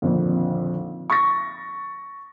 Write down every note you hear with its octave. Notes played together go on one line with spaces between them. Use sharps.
G#1 F2 A#2 D3 F3
C#6 A6 A#6